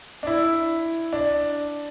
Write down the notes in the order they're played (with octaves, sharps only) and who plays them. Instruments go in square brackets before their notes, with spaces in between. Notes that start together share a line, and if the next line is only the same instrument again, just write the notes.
[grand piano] D4
E4
D4